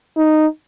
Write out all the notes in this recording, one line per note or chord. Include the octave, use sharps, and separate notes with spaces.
D#4